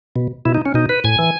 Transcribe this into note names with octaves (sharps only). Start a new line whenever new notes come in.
B2
B2 E4
D#4
C#4
B2 D#4
B4
A2 G#5
E3